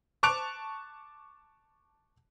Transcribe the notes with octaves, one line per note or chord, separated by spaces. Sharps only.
A5 C#6 D6 F#6 D7 F7